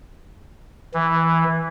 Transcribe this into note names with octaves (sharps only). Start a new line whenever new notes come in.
E3